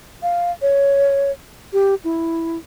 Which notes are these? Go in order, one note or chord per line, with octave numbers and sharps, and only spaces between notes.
F5
C#5
G4
E4